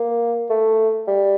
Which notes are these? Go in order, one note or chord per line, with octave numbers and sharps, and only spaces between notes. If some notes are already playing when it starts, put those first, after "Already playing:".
Already playing: A#3
A3
G3